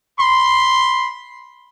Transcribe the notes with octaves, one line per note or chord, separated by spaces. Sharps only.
B5 C6